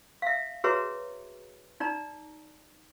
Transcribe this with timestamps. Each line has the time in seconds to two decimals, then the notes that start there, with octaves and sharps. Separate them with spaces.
0.22 E5 F5
0.64 F#4 G#4 B4 C#5 E5 A#5
1.80 D#4 D5 A#5